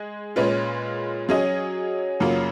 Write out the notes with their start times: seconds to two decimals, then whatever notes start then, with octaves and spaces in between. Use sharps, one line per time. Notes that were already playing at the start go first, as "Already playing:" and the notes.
Already playing: G#3 G#4
0.36 A#2 G#3 C#4 F4 B4
1.29 F#3 C#4 G#4 D#5
2.20 F#2 C#3 F#3 A#3 F4